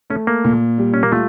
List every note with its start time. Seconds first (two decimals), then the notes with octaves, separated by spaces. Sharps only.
0.10 A3 C#4
0.27 A#3
0.45 A#2
0.78 G3
0.94 C#4
1.03 A#3
1.12 A3 F4